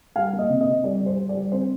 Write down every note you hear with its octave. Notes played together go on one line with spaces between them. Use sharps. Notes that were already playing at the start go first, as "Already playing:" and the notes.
G3 F5
A#3
D#5
C3
D#5
C3
G3 D5
G3
C5
G3
D5
G3
C4 C5